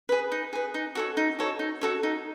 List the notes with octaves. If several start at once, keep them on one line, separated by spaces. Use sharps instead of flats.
G#4 B4
D#4
G#4 B4
D#4
F#4 A4 C#5
D#4
F#4 A4 C#5
D#4
F#4 A4 C#5
D#4